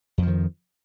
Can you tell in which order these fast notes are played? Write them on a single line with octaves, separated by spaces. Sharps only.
F2 F3 D#3